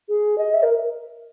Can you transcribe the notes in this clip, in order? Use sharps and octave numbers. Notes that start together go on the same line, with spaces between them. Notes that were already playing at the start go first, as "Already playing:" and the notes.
G#4
D#5
E5
A#4